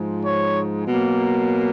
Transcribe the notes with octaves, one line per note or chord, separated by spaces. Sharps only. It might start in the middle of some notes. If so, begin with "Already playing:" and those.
Already playing: G#2 F3 G#3
C#5
B2 F#3 A#3